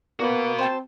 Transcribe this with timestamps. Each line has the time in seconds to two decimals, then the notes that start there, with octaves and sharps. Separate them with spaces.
0.20 A#3 B3 F#4 B5
0.58 C4 C5 G5 A5